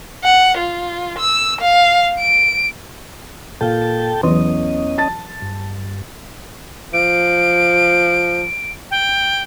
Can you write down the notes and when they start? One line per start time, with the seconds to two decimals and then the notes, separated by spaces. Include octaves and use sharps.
0.24 F#5
0.58 F4
1.19 E6
1.61 F5
2.19 D7
3.61 A#2 A4 F5 G5 A5
4.23 E2 E3 F#3 C#4 D#5
4.98 A5 A6
5.42 G2
6.93 F3 D7
8.91 G5